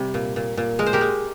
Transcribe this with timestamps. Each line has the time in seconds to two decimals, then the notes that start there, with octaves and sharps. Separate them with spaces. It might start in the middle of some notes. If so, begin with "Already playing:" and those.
Already playing: C3 G3
0.14 A#2
0.36 A#2
0.57 A#2
0.79 G#3 A#4
0.86 C5
0.93 G4 A#4
1.01 G#3